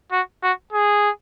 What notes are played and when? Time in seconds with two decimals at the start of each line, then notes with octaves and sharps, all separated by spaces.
0.12 F#4
0.43 F#4
0.73 G#4